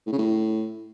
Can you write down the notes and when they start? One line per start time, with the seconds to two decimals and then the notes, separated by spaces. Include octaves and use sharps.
0.07 A2
0.12 C#3
0.18 A2